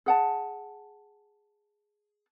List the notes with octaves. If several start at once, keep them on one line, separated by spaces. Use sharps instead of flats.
G#4 F#5 A5